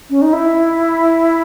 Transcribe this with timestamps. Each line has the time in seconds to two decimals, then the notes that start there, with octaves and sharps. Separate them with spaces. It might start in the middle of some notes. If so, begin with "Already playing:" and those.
0.10 C#4
0.22 D#4
0.33 E4